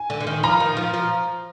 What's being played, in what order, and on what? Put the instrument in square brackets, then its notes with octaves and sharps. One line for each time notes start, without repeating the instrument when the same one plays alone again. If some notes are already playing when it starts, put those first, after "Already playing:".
Already playing: [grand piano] G#5
[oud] D3
D3
D#3
[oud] F3 [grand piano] A#5
[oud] D#3
F3
F3